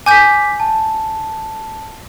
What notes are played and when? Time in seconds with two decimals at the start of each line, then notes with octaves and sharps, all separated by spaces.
0.06 G#5 D6 G6 B6 D#7
0.60 A5